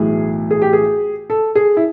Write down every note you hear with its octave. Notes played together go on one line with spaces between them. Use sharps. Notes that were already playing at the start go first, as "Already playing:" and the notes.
Already playing: B1 A2 E3 G#4
G#4
G4
G#4
A4
G#4
E4